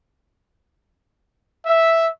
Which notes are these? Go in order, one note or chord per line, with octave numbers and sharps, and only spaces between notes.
E5